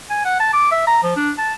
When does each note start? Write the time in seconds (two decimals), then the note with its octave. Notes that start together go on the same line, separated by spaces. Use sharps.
0.10 G#5
0.24 F#5
0.40 A5
0.53 D6
0.71 E5
0.87 A#5
1.03 F3
1.16 D4
1.38 A5